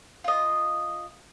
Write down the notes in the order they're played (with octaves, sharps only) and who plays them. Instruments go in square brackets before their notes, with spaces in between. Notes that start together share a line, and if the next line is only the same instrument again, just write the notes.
[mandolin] F4 D#5